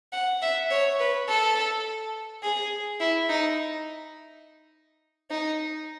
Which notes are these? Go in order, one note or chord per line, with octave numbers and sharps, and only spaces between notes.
F#5
E5
C#5
B4
A4
G#4
E4
D#4
D#4